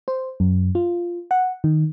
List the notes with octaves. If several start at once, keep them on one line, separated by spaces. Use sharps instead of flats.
C5
F#2
F4
F#5
D#3